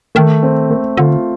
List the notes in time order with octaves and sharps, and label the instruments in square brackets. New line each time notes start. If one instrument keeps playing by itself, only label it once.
[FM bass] D#3 [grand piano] A3
[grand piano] C4
A3
[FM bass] D3 [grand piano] F4